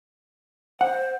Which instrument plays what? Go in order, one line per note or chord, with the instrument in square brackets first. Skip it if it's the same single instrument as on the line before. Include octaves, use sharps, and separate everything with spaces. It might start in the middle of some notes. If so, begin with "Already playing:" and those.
[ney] C5 [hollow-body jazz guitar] F#5